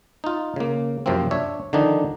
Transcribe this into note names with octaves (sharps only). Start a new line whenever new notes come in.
D#4 F4
C#3 A#3
F#2 C3 F3 A#3 C4
D4 C#5 E5
D3 D#3 F3 D4 D#4